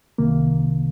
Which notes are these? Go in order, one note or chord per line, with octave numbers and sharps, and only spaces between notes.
C2 C3 D#3 A#3